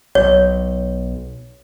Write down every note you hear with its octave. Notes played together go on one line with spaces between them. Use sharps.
B1 C#5